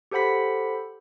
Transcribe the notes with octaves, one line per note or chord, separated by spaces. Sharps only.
G4 A4 C5 F#5 B5 B6